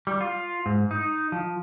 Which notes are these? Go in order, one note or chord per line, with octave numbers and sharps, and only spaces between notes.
G3
F4
G#2
D#4
F3